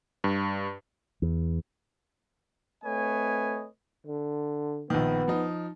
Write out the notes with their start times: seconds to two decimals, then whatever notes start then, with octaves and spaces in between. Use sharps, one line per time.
0.24 G2
1.22 E2
2.84 A3 C4 B4 C#5 D#5 G#5
4.07 D3
4.90 A#1 D#3 B3
5.28 F3 D#4